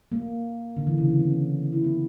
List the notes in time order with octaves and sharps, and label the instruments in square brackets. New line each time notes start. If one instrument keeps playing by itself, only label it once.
[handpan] A#3
D3
E3
C#3
D3
B3
C#4
E4
B3